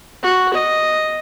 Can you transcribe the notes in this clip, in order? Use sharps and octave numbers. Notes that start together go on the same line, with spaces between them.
F#4
D#5